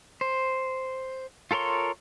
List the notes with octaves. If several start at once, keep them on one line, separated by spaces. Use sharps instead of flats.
C5
F4 A4 A#4 C#5 C6